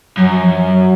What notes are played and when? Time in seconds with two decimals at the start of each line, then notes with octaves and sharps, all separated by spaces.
0.17 F#2 F#3
0.41 F3
0.65 F#3